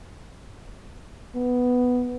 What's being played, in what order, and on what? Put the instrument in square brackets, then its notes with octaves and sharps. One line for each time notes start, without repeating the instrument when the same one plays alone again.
[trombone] B3